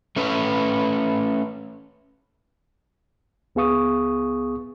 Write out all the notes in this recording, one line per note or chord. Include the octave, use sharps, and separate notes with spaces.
A3 C#4 B4
C#2 B3 G#4 F5 C#6 D#6